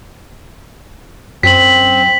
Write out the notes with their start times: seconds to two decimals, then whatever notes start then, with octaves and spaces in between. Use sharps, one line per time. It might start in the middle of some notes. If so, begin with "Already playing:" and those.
1.43 F#2 C4 B6 F#7